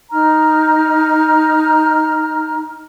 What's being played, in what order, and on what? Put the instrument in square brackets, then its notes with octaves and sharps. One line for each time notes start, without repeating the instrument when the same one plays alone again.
[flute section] D#4 A#5 F6